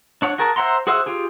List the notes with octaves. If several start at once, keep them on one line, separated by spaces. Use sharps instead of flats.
D4 C#5 F#5
F#4 G#4 A#4 A5
C5 E5 F#5 A#5 C6
F#4 G#4 C5 E5 F#5
F4 G4 G#4